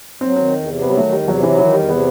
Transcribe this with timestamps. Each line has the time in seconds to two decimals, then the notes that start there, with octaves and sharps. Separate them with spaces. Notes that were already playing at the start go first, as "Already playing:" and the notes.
0.21 F#3 C4
0.36 D#3 C4
0.52 E2
0.67 C3
0.82 F#3 B3
0.90 G3
0.97 D#3 A3
1.12 E2 G3
1.27 C3 F#3
1.43 E3 F#3
1.58 D#3 E3
1.74 E2 G3
1.89 C3 B3